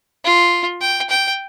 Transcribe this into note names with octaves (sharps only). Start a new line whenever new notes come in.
F4
G5
G5